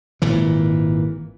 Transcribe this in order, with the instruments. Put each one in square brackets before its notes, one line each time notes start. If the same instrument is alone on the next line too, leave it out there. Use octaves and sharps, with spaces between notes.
[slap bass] G#1 A#2 E3